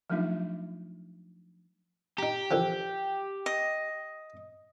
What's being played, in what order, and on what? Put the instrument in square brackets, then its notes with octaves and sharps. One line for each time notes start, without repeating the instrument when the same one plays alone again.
[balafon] F3 F#3 A3 D4 D#4 F4
[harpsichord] D#4 A#5 [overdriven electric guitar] G4
[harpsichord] D3 E3 F3
[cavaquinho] D#5